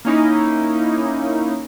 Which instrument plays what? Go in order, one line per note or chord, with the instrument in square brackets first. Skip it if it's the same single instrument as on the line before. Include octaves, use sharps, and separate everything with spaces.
[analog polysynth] A#3 C#4 D#4 E4